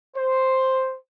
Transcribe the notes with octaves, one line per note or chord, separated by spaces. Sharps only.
C5